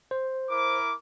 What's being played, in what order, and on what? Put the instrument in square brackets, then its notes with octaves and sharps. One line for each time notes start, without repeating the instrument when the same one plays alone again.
[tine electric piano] C5
[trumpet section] E4 A#4 D6